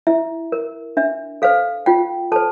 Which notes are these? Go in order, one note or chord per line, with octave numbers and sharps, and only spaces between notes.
E4 E5
A#4
D4 E5
A4 C5 F5
F4 G5
A4 C5 A5